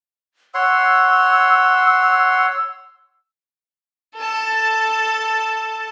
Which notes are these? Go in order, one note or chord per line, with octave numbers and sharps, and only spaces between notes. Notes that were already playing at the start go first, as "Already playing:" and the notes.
C#5 F#5 C6 E6
A4 A5